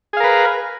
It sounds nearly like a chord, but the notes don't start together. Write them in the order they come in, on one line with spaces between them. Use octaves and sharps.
G#4 F5 A#4 B4